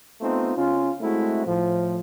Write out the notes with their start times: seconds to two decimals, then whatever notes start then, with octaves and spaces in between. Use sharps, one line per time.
0.21 A3 B3 C4 D#4 F4
0.57 C#3 C#4 F4
1.01 G#3 A3 C4 E4 F#4
1.46 A2 F3